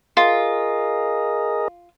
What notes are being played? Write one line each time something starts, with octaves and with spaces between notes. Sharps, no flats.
F4 G#4 A#4 D#5